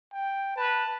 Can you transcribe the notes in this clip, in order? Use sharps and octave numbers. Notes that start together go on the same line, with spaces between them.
G5
B4 A5